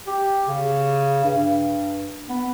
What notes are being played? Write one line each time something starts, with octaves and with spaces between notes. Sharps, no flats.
G4
C#3
G2
B3